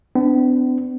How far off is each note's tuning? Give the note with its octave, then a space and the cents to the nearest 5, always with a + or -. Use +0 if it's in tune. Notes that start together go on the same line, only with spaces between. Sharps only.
B3 +45 D4 -5